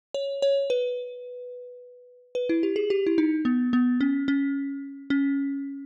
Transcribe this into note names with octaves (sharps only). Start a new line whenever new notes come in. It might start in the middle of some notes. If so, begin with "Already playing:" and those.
C#5
C#5
B4
B4
E4
G4
G#4
G4
E4
D#4
B3
B3
C#4
C#4
C#4